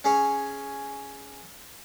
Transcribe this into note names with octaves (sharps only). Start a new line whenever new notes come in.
C#4 G#4 C#5